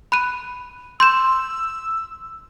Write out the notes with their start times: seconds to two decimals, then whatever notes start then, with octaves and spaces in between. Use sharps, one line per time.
0.12 B5 F#6 D#7
1.00 C6 E6 G6 E7